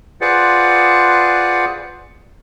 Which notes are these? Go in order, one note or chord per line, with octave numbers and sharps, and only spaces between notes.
F4 G#4 B4 C5 D5 F#5